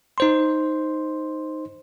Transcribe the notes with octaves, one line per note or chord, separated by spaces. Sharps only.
D#4 C5 C6